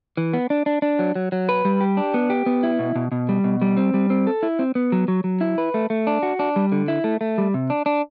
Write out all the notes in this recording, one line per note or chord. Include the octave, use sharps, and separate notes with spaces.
E3
B3
D4
D4
D4
F#3
F#3
F#3
B4
G3
G4
D4
B3
G4
B3
E4
B2
B2
B2
G3
B2
G3
C4
G3
C4
A4
E4
C4
B3
F#3
F#3
F#3
E4
B4
A3
A3
D4
F#4
D4
G3
D3
E4
A3
A3
G3
C3
D4
D4